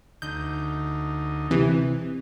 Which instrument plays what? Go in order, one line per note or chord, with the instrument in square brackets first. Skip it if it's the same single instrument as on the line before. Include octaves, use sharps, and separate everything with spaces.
[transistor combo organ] D2 D#4 [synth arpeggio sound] G6
[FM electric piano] C3 [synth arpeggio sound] E3